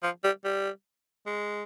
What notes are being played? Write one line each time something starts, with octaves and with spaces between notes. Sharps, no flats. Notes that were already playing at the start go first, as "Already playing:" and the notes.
F3
G3
G3
G#3